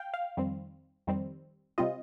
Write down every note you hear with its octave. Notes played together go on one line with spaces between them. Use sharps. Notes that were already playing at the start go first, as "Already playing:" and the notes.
Already playing: F5 G5
F5
F2 D#3 G3 C4
F2 D#3 G3 C4
C3 G3 C4 F4 D#5